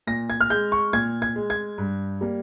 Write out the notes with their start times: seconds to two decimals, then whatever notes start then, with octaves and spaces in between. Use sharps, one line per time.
0.07 A#2 A#6
0.30 G#6
0.41 F6
0.50 G#3 G6
0.72 C#6
0.93 A#2 G#6
1.22 G#6
1.36 G#3
1.50 G#6
1.78 G2
2.21 G3 A#3